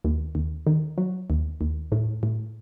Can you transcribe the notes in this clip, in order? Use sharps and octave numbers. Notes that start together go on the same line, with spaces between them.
D#2
D#2
D#3
F#3
D#2
D#2
A2
A2